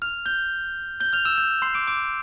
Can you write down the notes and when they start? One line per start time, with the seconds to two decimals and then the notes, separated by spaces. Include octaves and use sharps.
0.02 F6 F7
0.26 G6 G7
1.00 G6 G7
1.13 F6 F7
1.25 E6 E7
1.38 G6
1.62 C6 C7
1.74 D6 D7
1.87 D6 D7